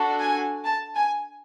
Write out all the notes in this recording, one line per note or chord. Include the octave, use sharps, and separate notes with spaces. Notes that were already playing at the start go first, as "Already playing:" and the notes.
Already playing: D4 F#4 A4
G#5
A5
G#5